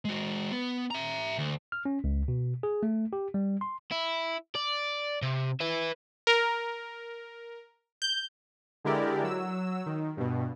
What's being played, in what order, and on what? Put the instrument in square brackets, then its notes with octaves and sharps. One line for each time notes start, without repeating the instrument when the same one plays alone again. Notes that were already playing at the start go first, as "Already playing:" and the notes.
[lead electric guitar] G#3 F#4
B3
E5 A#5
D2
[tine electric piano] F6
C#4
C#2
B2
G#4
A3
G4
G3
C6
[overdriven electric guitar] E4
D5
C3
B4 E5
[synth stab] A#4
G6
[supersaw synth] D3 G#3 E4 G4 A#4 D5
F#3 E6
D#3
G2 B2